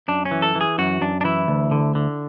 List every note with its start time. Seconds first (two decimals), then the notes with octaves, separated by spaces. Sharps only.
0.08 F#2 D4
0.25 C#4
0.31 E3
0.42 A4
0.55 E3
0.61 G#4
0.78 F#2 F#4
1.01 F#2 D4
1.21 D4
1.24 E3 E4
1.48 D2
1.71 D3
1.95 D3